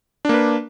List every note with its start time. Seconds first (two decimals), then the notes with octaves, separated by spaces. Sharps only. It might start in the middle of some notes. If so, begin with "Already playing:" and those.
0.25 D4
0.29 A#3
0.34 B4